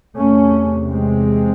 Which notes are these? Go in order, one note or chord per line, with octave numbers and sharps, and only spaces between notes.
E2 C3 A3 C#4
G#3 C4